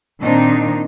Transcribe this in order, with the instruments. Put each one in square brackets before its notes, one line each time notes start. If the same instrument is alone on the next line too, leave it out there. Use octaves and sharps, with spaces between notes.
[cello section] A#2 D#3 C4 D4 D#4